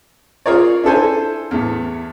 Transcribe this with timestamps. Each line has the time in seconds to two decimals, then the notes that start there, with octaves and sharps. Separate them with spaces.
0.46 F4 G#4 A#4 C#5 D5
0.84 D4 E4 A4 C5 G#5
1.51 E2 A2